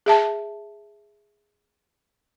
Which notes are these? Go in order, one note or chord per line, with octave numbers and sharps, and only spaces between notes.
G#4 E5 A5